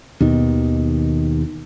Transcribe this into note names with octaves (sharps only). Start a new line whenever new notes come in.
D#2 B2 D#3